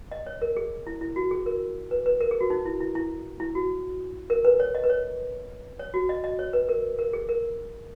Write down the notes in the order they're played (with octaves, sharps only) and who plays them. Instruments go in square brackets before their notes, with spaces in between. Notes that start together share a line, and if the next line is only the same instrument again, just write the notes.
[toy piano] D#5
C#5
A#4
G#4
E4
E4
F#4
G#4
A#4
B4
B4
A#4
G#4
F#4
D#4
E4
E4
E4
E4
F#4
A#4
B4
C#5
D#5
B4
C#5
C#5
F#4
D#5
D#5
C#5
B4
A#4
A#4
G#4
A#4